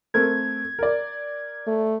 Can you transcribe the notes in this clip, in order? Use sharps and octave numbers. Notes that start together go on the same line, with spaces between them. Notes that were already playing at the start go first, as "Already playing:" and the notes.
A3 C4 A#4 G#6
A#4 D5
A3